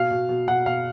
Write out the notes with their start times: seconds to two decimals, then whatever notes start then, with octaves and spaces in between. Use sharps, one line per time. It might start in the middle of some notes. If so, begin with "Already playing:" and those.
Already playing: B2 F5
0.11 B2
0.29 B2
0.48 B2 F#5
0.66 B2 F5